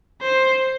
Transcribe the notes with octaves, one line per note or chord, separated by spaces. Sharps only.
C5